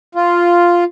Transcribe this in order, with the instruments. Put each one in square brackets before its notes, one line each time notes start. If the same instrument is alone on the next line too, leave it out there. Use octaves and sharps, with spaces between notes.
[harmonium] F4